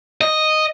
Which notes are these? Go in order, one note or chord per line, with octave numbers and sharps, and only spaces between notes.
D#5